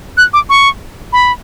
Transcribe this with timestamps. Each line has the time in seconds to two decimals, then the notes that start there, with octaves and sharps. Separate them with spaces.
0.17 F#6
0.33 D6
0.50 C#6
1.13 B5